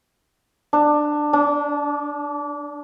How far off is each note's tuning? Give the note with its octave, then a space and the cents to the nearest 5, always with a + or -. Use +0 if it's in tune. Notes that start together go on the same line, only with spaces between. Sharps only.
D4 +15
D4 -25